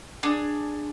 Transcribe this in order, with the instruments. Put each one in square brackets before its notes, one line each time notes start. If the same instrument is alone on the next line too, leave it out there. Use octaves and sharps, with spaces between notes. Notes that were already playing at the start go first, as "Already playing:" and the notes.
[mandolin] D4 G#4